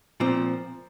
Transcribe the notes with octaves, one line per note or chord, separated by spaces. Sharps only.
A#2 F3 C4